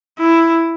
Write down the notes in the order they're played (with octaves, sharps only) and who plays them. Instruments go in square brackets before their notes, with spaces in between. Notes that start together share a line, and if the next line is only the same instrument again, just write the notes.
[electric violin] E4